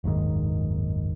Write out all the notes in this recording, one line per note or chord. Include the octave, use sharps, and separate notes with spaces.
F#1 D#2 G#2 D#3